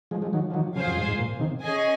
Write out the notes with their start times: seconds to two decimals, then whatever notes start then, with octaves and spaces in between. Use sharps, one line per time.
0.11 F3 G#3
0.22 F3 G#3
0.33 D#3 F#3
0.50 F3
0.54 D#3 F#3
0.76 C#3 F3 F4 G#4 C5 F5 G#5
0.86 F#2
0.97 G#2
1.08 G#2
1.19 A#2
1.39 C3 D#3
1.61 C#4 G#4 D#5 G#5